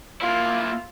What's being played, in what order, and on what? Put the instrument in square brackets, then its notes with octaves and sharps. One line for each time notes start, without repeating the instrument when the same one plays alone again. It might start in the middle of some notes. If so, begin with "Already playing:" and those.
[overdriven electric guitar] A#3 E4 [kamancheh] F4